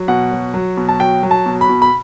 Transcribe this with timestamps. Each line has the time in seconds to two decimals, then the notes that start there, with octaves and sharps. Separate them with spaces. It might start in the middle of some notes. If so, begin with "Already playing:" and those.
Already playing: F#3
0.08 B2 F#5
0.32 F#3
0.54 F#3
0.77 B2
0.89 A5
1.00 F#3 G5
1.23 F#3
1.31 A5
1.46 B2
1.61 B5
1.69 B2
1.82 B5